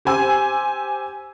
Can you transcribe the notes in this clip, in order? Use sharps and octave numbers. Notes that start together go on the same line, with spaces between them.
G4 C5 G#5 E6